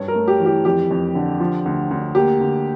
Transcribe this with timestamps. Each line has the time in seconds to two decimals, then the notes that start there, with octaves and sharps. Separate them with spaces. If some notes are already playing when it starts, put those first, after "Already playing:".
Already playing: G2 C#5
0.08 A#4
0.15 A3
0.28 G4
0.40 E3
0.46 G4
0.65 F2 G4
0.90 F2
1.15 D3
1.40 F3
1.66 D2
1.91 D2
2.15 A#3 G4
2.40 D2